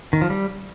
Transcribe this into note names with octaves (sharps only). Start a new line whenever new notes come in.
D#3
F3
G3